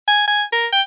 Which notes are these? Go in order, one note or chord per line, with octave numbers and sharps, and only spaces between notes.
G#5
G#5
A#4
G5